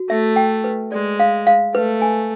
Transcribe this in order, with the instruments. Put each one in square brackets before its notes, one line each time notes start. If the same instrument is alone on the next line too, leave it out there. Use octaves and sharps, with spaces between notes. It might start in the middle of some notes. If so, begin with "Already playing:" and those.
Already playing: [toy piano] F#4
[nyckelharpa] A3 [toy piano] E5
[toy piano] G5
B4
[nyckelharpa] G#3 [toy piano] D5
[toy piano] F5
F5
[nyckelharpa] A3 [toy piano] B4
[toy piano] G#5